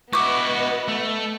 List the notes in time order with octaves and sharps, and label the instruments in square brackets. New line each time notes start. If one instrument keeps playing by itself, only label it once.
[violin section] B3 B4 D#5 [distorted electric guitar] E4 F#4 [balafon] C#6 D6
[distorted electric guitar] A3